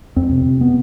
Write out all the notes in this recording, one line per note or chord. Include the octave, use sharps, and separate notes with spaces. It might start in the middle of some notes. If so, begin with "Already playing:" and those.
F2 C4
C3
C3
B3